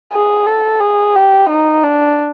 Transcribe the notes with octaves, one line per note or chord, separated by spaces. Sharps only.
G#4
A4
G#4
G4
D#4
D4